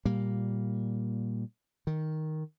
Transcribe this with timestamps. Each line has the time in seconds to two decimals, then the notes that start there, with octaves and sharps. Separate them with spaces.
0.05 A#2 G3 A#3
1.87 D#3